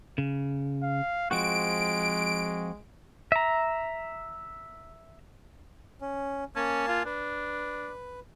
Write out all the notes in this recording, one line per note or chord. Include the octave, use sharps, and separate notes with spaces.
C#3
F5
F3 G#3 C4 F#4 D7
E5 A#5
C#4
A#3 C#4 G#5 A5
F4
D4 B4